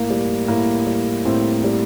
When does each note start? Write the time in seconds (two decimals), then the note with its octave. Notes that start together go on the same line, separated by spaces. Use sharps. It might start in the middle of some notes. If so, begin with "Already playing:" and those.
Already playing: A2 A#3
0.10 G3
0.48 A2 A#3
0.87 G3
1.25 A2 C4
1.64 G3